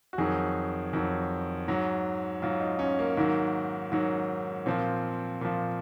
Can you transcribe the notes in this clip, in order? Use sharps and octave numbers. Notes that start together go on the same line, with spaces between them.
F#4
F2 D#3 F#3 G#4
F2 D#3 F#3
G#2 F#3
G#2 F#3 F4
D#4
C#4
A#3
G#2 D#3 F#3 A#3
G#2 D#3 F#3
A#2 F3 C4
A#2 F3